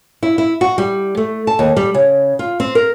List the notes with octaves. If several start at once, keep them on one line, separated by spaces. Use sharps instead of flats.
E4
E4
F#4
G3
A3
A5
D#2
G3
C#3
F4
C4
A#4